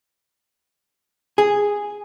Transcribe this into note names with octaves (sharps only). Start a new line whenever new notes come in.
G#4